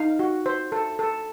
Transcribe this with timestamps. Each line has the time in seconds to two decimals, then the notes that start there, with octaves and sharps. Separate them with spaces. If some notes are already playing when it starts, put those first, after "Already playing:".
Already playing: D#4 F5
0.19 F#4
0.46 C5
0.72 A4
0.99 A4